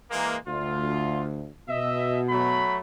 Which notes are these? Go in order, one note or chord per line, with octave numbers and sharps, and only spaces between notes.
E3 G#3 A#3
D2 F4
B2 D#5 E5
F#3 A3 B5